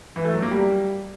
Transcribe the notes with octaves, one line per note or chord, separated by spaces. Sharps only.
E3
A3
F#3
A#3
G3